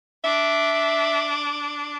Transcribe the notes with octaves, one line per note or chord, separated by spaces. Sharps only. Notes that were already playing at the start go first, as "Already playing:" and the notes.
D4 E5